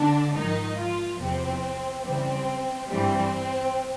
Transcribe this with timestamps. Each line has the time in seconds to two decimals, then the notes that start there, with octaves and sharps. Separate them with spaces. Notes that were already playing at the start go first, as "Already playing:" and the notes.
Already playing: D3 D4
0.34 G#2 D#3 F3 D#4
0.77 F3 F4
1.19 E2 C3 F3 C4
2.05 F#2 C#3 E3 G3 C4
2.88 G2 E3 G3 C4